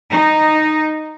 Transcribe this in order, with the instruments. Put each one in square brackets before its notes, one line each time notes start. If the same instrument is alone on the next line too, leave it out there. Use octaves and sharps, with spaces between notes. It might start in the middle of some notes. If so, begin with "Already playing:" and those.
[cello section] D#4